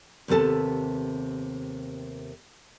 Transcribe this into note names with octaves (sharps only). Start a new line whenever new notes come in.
D#2 C3 B3 A4 A5